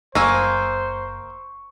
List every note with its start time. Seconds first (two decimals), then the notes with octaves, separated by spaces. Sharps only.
0.15 F#1 A#3 C5 G#5 C#6 E6